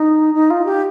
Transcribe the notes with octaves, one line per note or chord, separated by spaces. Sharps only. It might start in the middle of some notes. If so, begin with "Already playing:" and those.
Already playing: D#4
D#4
F4
G4